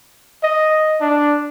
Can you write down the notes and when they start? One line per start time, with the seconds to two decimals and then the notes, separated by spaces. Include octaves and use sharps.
0.43 D#5
1.01 D4